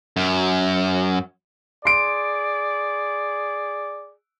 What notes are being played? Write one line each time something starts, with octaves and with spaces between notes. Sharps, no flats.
F#2
G#4 D5 C6 D7